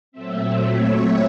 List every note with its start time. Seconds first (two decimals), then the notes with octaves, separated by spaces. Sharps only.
0.12 A#2 F#3 A3 C4 E5
0.63 C#5